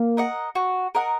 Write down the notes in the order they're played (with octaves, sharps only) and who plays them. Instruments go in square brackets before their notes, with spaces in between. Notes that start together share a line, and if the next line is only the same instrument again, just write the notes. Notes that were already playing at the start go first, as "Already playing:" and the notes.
Already playing: [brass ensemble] A#3
[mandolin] A#4 D#5 F#5
F#4
A#4 D#5 F#5